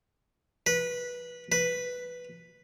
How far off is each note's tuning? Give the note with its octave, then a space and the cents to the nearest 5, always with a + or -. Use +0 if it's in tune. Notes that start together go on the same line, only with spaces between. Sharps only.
B4 -15
B4 +0